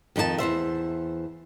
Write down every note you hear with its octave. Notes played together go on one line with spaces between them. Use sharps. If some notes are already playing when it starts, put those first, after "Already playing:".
F2 D#3 D#4 F#4 A5
E2 D#3 C5 E5